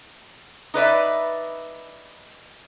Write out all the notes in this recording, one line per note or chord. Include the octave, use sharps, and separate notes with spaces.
D#4 B4 D5 E5